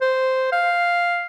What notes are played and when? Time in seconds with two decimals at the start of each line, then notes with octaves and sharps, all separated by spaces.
0.01 C5
0.52 F5